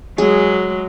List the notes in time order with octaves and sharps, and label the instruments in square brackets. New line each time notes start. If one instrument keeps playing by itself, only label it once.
[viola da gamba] F#3 G#3 [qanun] G#4